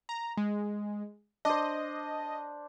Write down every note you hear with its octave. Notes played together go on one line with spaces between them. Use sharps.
A#5
G#3
D4 C5 D#5